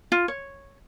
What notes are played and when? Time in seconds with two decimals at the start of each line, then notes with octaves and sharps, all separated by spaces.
0.12 F4
0.28 C#5